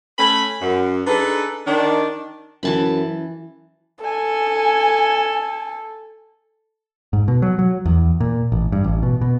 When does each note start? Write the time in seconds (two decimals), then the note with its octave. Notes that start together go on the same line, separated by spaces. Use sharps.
0.18 A3 C#4 G#5 B5
0.61 F#2
1.06 D4 D#4 G#4 A4 B4
1.67 D#3 D4
2.63 F#2 E3 A5 B5
4.04 A4 G#5
7.13 G#2
7.28 B2
7.42 F#3
7.59 F#3
7.86 E2
8.20 A#2
8.52 A1
8.72 G2
8.84 A1
9.03 B2
9.21 B2